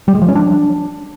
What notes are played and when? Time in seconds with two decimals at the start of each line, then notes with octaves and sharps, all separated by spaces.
0.08 G3
0.15 G#3
0.22 F3
0.28 C#4
0.35 D4